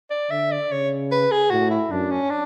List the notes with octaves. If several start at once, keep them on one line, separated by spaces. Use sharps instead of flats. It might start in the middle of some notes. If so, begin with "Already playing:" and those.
D5
D3 E5
D5
C#3 C#5
B4
G#4
A2 F#4
E4
F#2 D4
C#4
D4